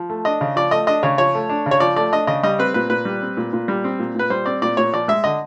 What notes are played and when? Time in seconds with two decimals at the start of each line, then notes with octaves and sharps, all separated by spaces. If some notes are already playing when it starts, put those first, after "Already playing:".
Already playing: F3
0.10 A3
0.25 D4 D#5
0.41 C#3
0.56 F3 D5
0.71 A3 D#5
0.87 D4 D#5
1.03 C#3 C#5
1.18 F3 C#5
1.35 A3
1.49 D4
1.66 C#3
1.71 C#5
1.80 F3 D5
1.96 A3 D5
2.12 D4 D#5
2.27 C#3 D#5
2.43 G3 D#5
2.59 C4 B4
2.74 A#2 B4
2.90 A#2 B4
3.05 G3
3.22 C4
3.37 A#2
3.53 A#2
3.68 G3
3.84 C4
3.99 A#2
4.15 A#2 B4
4.30 G3 C5
4.46 C4 D5
4.62 A#2 D5
4.77 A#2 C#5
4.93 F3 D5
5.08 G#3 E5
5.24 D3 D#5